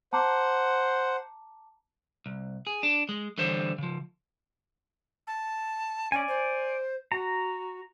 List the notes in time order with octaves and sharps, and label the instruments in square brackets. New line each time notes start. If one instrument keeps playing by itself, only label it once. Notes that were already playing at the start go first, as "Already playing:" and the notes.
[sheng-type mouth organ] C5 F#5 [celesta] A5 A#5 D6
[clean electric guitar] C2
G#4
D4
G#3
D3 E3 G3 C5 C#5
C#3 F3
[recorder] A5
[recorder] C#4 [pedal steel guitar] D5 G#5
[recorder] C5
[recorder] F#4 [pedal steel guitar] A#5